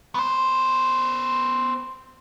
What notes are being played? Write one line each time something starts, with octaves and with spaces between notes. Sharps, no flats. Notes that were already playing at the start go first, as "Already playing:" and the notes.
B3 C5